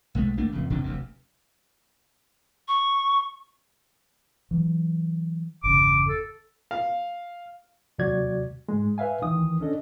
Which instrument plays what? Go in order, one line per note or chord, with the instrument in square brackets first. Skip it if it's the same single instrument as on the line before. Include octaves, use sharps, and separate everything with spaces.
[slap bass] B1 G#3 A3
G1 A3 A#3 D4
D1 F2 C#3
D#1 E2 C3 D4
F1 D2 C3
[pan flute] C#6
[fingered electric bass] E3 F#3
[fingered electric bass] G1 E2 C#3 [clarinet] D6
[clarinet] A4
[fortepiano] F5
[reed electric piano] D#2 C3 F#3 F#4 D5 G#6
G#2 G#3
B4 E5 F5 G#5
D2 D#3 E3 D#6
C#4 D4 A4 D#5